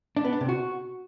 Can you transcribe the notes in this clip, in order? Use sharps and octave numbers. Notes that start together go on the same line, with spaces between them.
D4
B3
D4
C3
F#4